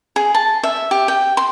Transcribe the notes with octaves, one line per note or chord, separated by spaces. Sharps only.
G#4
A5
E5
G4
G5
C6